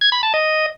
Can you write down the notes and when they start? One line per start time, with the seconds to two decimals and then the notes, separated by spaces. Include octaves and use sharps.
0.01 G#6
0.12 B5
0.23 A5
0.34 D#5